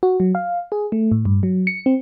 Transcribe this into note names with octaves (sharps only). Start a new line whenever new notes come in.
F#4
F#3
F5
G#4
A3
A2
G2
F#3
C#7
C4